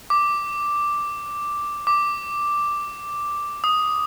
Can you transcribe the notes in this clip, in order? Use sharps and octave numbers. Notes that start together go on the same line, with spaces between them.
D6
D6
D#6